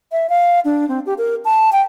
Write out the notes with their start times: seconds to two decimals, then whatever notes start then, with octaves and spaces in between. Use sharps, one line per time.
0.12 E5
0.29 F5
0.65 D4
0.89 C4
1.06 G4
1.18 A#4
1.45 A5
1.73 G5